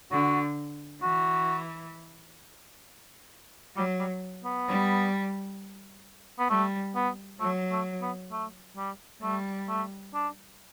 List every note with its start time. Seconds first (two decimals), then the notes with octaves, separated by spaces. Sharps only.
0.11 D3 F#4
1.02 E3 F#4
3.76 F#3 G3
3.99 G3
4.44 B3
4.67 G3
6.39 B3
6.50 G3 A3
6.95 B3
7.40 F#3 A3
7.71 A3
8.02 B3
8.31 A3
8.77 G3
9.22 G3 A3
9.68 A3
10.14 D4